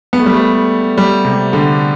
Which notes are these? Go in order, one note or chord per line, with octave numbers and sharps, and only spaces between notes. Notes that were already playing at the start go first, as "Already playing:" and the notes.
B3
A3
G3
A3
G3
C3
D3